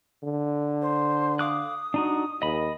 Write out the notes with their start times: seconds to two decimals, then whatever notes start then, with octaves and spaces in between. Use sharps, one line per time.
0.24 D3
0.81 C5
1.39 F5 D6 D#6 F#6
1.94 D4 D#4 F#4
2.42 D#2 D#5 B5